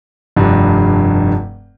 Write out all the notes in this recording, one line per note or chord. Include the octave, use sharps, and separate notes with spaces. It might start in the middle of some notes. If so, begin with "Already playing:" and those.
F1 G2 D4